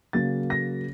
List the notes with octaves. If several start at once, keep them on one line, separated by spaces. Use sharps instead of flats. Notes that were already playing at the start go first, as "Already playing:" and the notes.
C#3 F#3 A#3 A6
A#6